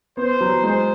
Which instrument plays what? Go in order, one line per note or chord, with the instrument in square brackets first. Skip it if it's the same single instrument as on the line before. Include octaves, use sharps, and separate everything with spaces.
[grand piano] B3 [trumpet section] C5
[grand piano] F#3
[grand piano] G#3 [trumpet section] C5